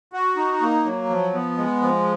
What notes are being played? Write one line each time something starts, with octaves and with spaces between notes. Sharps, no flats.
F#4
D#4
A#3
F#3
F3
B3
G#3
F3